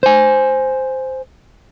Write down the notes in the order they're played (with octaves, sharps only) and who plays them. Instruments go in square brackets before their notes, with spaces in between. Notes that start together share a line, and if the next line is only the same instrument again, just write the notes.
[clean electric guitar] C5 G#5